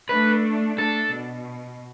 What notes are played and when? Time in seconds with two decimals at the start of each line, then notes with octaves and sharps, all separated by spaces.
0.09 A3 D4 B4
0.78 A3 D4 A4
1.13 B2